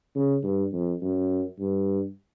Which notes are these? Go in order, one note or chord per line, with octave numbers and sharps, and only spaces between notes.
C#3
G2
F2
F#2
G2